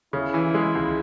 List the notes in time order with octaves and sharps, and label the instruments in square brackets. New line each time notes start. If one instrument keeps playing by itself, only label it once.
[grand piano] C#3 [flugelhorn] E4
[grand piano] E3
G#3
C#2